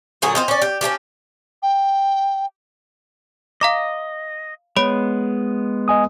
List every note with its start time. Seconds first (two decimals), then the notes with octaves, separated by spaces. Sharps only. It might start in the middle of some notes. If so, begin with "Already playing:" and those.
0.22 A#2 D3 F#3 G#4
0.35 C4 F4 D#5
0.48 C#4 D5
0.62 G4
0.81 C#4 D4 E4 G4
1.63 G5
3.61 D#5 F5 A#5 D6
4.76 G#3 B3 C#5 B5 D7
5.88 D#5 G#5 D#6